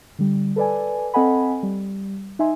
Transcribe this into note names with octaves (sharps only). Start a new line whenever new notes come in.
D3 G3
A4 B4 D5 G#5
C4 A4 D#5 F#5 G#5 B5
G3
D#4 E5 G#5 C6